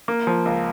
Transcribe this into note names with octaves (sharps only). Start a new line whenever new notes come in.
A#3
F3
C#2